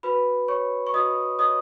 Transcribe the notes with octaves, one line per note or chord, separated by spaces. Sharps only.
F#4 B4 B5
C#5 C#6
C#6
F#4 D#5 D#6
C#5 D#5 D#6